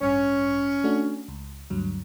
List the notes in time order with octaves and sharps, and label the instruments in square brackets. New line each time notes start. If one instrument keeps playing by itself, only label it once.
[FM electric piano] A1 G2 [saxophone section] C#4
[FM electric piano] A3 D4 F#4
C#2
D2 G2 F#3